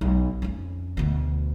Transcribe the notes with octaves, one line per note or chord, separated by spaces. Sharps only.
B1
F2 C#4
D2 B2